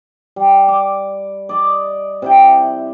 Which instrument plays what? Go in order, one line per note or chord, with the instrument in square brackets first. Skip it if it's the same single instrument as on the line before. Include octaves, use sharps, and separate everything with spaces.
[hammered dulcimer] G3
D6
D5 D#5
C3 E4 G5